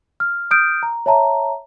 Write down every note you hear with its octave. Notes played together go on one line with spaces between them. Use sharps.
F6
D#6 F6 G6 D7
A#5
C#5 E5 A5 A#5